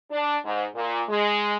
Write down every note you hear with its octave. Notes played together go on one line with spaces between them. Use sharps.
D4
G#2
A#2
G#3